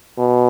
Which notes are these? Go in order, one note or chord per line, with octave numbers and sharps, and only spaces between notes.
B2